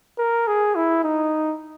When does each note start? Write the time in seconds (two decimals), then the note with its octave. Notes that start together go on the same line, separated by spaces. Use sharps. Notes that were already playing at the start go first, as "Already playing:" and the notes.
0.18 A#4
0.47 G#4
0.75 E4
1.04 D#4